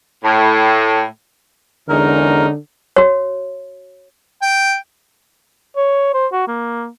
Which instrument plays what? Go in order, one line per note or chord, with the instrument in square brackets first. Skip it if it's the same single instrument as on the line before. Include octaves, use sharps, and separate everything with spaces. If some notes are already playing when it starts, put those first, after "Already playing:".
[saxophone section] A2
[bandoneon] E2 A#4 [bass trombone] D3 [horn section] G#3 C#4 D#4
[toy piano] F#4 C#5
[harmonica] G5
[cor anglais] C#5
C5
F#4
A#3